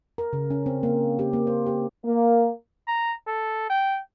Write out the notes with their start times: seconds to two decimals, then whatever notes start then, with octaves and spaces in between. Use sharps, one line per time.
0.18 A#4
0.33 C#3
0.50 C#4
0.66 C4
0.83 A#3
1.19 G4
1.33 A#3
1.47 C5
1.66 G4
2.05 A#3
2.87 A#5
3.27 A4
3.70 G5